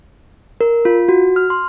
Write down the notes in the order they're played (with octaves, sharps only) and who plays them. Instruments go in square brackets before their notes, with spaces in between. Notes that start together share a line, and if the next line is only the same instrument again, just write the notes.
[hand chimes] A#4
F4
F#4
F6
C6